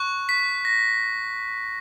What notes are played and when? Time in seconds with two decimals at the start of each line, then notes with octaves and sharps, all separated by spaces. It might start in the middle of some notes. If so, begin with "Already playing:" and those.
Already playing: C#6 F#6
0.29 B6
0.65 A#6